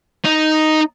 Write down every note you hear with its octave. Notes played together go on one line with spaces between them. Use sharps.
D#4